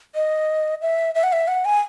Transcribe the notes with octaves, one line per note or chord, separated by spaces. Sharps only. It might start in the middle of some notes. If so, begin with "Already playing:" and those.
D#5
E5
E5
F#5
E5
F#5
G#5